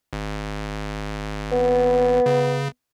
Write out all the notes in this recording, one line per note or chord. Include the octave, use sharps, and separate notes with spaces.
G#1
B3
C#3